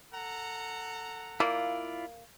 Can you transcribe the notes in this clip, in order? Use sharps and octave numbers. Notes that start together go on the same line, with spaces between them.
A4 F#5 A#5
A#3 E4 F4 D5